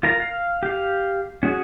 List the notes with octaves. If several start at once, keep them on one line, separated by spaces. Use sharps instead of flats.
F4 A#4 A#5
F5
G4 F5
C#4 F#4 G#4